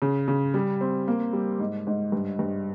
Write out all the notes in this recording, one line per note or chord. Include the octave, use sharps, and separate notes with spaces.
C#3
C#3
G3
C4
A#3
G3
G#2
G#2
G2
G2